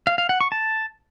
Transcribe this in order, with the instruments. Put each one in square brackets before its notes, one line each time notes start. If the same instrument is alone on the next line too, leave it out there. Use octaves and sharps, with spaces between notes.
[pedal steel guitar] F5
F5
F#5
C#6
A5